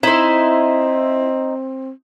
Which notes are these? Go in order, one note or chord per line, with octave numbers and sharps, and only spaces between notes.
C4 D#4 E4 C5